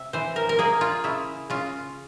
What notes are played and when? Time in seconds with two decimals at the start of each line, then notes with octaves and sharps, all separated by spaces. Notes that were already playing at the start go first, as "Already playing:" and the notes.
Already playing: C3 E5
0.13 E3 C5
0.36 A#4
0.49 A#4
0.59 A#3 G#4
0.81 F4
1.04 C#3 E4
1.50 C#3 F4